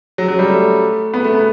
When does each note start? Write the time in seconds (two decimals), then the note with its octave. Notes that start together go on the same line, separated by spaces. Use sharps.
0.18 F#3
0.28 F#3
0.39 G3
0.50 A3
1.14 B3
1.24 A3
1.35 B3